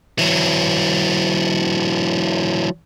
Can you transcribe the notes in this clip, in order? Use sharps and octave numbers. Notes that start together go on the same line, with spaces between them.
E3 F#3